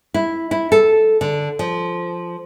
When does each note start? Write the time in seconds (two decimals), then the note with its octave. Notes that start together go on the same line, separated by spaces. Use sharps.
0.14 E4
0.51 E4
0.72 A4
1.21 D3
1.59 F3